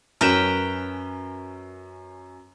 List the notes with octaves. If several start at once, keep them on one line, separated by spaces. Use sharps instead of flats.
F#2 C#4 A#4 B4 G5 E7